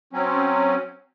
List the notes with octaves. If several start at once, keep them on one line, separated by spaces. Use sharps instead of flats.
F#3 C4 C#4